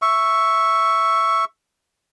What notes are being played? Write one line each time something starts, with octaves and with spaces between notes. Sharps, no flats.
E5 C#6